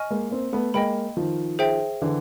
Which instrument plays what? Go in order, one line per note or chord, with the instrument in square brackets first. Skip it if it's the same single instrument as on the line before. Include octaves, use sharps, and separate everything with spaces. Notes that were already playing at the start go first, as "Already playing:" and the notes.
Already playing: [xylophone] D#5 G#5 C#6 F6
[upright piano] G#3 A#3
A#3 C4
A3 B3
[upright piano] G#3 A#3 [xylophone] D#5 G5 B5
[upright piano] D#3 F3
[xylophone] G#4 C5 E5 G5
[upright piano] D3 E3